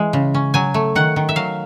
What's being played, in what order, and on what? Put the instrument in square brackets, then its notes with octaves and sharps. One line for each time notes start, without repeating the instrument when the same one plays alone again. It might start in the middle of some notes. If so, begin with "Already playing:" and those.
Already playing: [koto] E3 G#3
C#3
C#4
F#3 G#5
A3
D#3 F#5
D#3
E5
F#3 F5